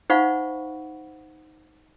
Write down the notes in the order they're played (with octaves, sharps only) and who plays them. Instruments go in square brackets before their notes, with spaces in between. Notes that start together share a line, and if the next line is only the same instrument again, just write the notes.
[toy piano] D#4 C5 F5 F#5 B5 C#6